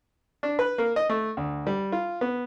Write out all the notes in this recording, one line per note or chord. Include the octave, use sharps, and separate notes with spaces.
D4
B4
A#3
D#5
A3
D2
G3
F4
B3